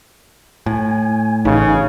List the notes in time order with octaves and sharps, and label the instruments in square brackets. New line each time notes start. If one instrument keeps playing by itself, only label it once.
[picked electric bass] A2 [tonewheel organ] G#5
[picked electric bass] A1 [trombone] C#3 [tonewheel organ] D#4